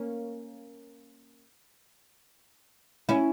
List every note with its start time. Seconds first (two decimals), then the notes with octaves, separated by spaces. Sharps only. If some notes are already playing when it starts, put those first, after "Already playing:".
Already playing: A#3 C#4
3.09 C#4 E4